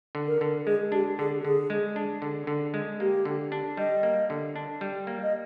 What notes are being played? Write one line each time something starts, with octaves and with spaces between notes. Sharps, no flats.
D3
A#4
D3
G#3 G#4
D4 G4
D3 G#4
D3 G#4
G#3
D4
D3
D3
G#3
A#3 G4
D3
D4
G3 D#5
A#3
D3
D4
G3
A#3
D#5